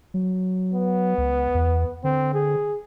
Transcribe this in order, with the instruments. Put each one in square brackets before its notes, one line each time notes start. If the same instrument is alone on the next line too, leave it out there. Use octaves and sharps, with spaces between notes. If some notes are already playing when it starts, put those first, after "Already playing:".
[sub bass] F#3
[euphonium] B3
[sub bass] C#2
E2
[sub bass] D3 [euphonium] C4
[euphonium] G#4